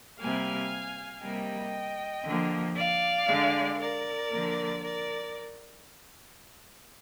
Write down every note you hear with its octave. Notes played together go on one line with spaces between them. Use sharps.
C3 G3 A#3 F5 G#5
C3 G3 A#3 D#5 G5
D3 F3 A#3
D5 F5
D3 G#3
A#4 D5
D3 F3 A#3
A#4 D5